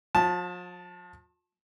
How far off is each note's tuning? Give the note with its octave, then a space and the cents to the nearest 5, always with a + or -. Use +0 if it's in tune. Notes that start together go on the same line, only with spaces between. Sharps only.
F3 +40 A5 +0